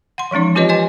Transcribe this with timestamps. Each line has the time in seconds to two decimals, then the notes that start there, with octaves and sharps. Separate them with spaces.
0.18 F#5 C6
0.31 E3 F3 G#3 C#4 D#4
0.55 C4 F4 G4 B4 C#5 D#5
0.69 C5 D#5 G#5 C6